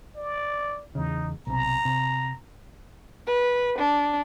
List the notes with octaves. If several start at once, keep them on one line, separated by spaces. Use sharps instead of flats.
D5
E2 C#3 D#4
B1 C3 A#5
C3
B4
D4